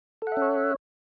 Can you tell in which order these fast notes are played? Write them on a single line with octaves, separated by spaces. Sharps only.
A4 F#5 E5 C#4 C#5